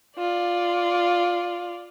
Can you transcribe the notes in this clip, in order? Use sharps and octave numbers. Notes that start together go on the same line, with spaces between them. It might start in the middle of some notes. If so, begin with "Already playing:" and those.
F4 D5